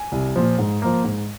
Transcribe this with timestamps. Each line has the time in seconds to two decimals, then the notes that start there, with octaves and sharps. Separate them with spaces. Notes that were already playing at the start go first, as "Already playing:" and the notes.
Already playing: G#5
0.12 C2
0.36 A#2 F3
0.59 G#2
0.82 F3 A#3
1.04 G#2